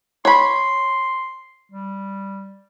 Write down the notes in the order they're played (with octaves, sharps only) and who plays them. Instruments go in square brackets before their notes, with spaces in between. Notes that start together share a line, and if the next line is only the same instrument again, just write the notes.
[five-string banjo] C#5 B5 [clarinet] C6
[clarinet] G3